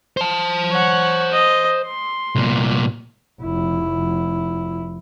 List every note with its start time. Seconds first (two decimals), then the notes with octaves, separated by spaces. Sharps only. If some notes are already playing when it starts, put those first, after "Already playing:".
0.17 C5 A5
0.73 C#5 F#5
1.32 D#5
1.86 C6
2.35 C2 A#2
3.42 F1 E4